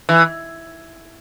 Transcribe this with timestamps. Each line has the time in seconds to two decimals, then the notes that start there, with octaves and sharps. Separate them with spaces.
0.09 E3